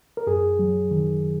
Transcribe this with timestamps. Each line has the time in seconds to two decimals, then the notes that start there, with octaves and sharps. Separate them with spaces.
0.17 A#4
0.27 F#2 G#4
0.59 F#3
0.91 D#3